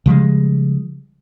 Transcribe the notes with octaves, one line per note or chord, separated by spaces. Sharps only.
C#3 F3 G3 G#3